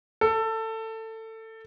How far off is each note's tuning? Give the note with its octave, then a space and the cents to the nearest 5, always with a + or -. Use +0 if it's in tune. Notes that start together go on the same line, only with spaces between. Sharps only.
A4 +20